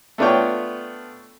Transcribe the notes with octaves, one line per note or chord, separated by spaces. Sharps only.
A3 B3 D4 F4 C#5 G5